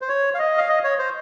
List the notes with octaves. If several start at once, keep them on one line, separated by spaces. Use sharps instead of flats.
C5
C#5
F5
D#5
F5
D#5
C#5
C5